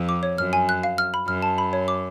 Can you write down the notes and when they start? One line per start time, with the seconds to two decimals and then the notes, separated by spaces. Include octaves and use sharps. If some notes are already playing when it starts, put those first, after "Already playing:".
Already playing: F2
0.09 D6
0.23 C#5
0.38 F#2 F6
0.53 G#5
0.69 F#6
0.83 F5
0.98 F6
1.14 B5
1.27 F#2 F6
1.42 A5
1.58 B5
1.73 C#5
1.88 D6